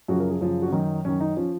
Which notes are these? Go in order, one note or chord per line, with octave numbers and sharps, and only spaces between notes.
F#2 C#3 F3 F#4
A#4
G#4
F#2 C#3 F3
F#4
C#4
F#2 D#3 D#4
F#2 D#3 C#4
D#4
F3 C#4